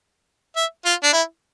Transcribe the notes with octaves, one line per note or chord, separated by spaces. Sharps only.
E5
F4
D4
E4